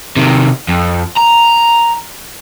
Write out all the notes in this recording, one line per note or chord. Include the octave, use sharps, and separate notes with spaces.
C3 D#3
F2
A#5